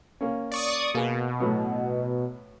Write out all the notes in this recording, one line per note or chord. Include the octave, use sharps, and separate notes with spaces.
A#3 C#4
D5 C#6 D#6
B2 A#3 G#4
A2 F#3 B3